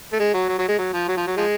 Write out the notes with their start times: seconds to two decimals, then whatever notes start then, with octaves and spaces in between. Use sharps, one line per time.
0.12 A3
0.20 G#3
0.34 F#3
0.48 F#3
0.58 F#3
0.68 G#3
0.78 F#3
0.93 F3
1.08 F#3
1.17 F3
1.26 F#3
1.37 F3 G#3